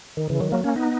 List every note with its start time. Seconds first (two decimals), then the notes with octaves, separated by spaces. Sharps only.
0.17 D#3
0.30 C#3 E3
0.41 D#3 F#3
0.52 F#3 A#3
0.64 A#3 C#4
0.76 B3 D#4